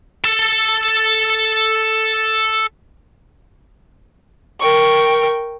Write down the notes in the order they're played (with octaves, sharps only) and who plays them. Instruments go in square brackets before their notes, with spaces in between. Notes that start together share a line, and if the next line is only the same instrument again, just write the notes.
[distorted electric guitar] A4 A5
[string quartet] A#4 G5 C#6